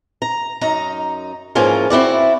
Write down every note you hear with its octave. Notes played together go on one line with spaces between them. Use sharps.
A#5
F#2 D#4 A#5
G#2 E3 F3 A#3 C#4 F4
C4 E4 F#4 D5